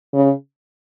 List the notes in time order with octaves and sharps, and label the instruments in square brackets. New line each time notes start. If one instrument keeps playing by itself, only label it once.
[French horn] C#3